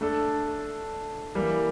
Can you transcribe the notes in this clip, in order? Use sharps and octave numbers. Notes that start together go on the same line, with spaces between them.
A3 D4 A4
E3 G3 A#3